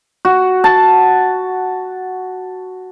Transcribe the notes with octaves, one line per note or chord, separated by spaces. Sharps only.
F#4
A5